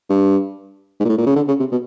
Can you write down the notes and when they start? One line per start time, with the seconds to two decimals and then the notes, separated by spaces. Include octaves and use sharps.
0.10 G2
1.00 G#2
1.05 A#2
1.09 A2
1.18 A#2
1.26 C#3
1.36 D3
1.48 C#3
1.60 C3
1.72 B2